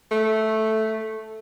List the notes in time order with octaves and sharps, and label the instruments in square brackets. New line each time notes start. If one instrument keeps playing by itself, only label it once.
[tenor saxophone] A3